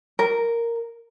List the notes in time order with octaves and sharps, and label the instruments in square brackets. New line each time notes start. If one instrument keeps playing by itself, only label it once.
[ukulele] A#4